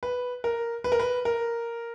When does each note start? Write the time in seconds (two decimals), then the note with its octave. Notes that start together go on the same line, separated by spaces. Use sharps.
0.03 B4
0.44 A#4
0.84 B4
0.92 A#4
1.00 B4
1.25 A#4